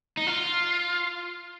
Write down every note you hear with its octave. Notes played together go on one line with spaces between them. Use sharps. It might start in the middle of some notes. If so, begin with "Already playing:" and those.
D#4
F4